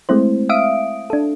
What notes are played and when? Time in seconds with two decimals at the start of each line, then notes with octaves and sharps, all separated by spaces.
0.09 G#3 A3 C4 E4 C5
0.49 E5 F5 D#6 D7
1.10 D4 A4